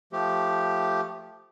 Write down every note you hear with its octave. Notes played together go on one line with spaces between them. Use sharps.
F3 A3 G4